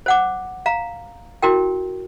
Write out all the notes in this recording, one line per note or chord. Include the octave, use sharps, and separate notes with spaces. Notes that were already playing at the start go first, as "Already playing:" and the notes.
C5 F#5 D6
F5 A#5
E4 F#4 A#4 G5